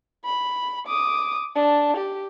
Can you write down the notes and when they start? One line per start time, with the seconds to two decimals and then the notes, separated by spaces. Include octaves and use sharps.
0.25 B5
0.87 D6 D#6
1.55 D4 A5
1.97 G4